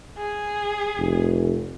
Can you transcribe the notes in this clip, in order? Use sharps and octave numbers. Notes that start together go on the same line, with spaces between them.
G#4
F1